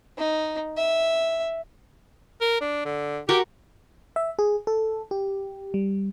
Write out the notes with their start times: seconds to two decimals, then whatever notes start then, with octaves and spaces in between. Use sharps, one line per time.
0.18 D#4
0.77 E5
2.41 A#4
2.61 D4
2.85 D3
3.29 F#4 G4 A#4
4.16 E5
4.39 G#4
4.67 A4
5.11 G4
5.74 G3